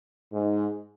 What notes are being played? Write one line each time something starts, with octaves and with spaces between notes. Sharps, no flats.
G#2